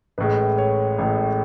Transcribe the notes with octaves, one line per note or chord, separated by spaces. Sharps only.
A1 A2 G#3 B4
C#5
A1 A2 G#3